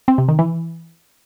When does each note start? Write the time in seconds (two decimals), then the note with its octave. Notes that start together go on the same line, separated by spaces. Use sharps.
0.08 C4
0.18 C3
0.28 D#3
0.39 E3